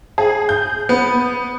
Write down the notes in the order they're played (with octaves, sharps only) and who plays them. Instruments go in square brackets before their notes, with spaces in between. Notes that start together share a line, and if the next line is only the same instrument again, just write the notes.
[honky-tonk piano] G#4
G6
B3